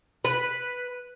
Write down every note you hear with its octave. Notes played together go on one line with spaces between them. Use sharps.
B4